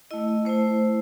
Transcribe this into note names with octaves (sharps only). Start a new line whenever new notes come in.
A3 E4 D#5
A3 E4 C5